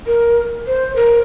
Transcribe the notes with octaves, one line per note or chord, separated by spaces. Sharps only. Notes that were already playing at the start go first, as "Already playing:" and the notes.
A#4
C5
A#4